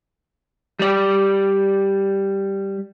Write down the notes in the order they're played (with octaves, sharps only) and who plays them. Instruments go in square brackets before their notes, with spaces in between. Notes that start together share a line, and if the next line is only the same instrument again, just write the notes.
[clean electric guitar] G3 D5